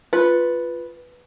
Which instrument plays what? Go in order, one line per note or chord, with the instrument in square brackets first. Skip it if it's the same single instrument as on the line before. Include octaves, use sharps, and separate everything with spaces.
[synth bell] F4 [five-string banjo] B4